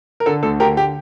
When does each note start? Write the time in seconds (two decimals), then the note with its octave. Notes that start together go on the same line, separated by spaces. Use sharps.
0.20 A#4
0.26 D3 A4
0.43 D2 A4
0.60 D3 G4 A#4
0.77 G4